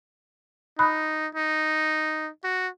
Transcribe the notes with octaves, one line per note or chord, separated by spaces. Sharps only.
D#4 B5 D#6 F#6
D#4
F#4